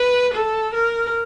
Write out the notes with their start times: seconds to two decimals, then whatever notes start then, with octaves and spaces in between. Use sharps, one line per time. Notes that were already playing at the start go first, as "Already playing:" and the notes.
Already playing: B4
0.34 A4
0.74 A#4